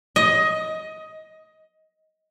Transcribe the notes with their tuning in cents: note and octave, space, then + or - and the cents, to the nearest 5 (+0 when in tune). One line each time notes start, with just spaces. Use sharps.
D#5 +15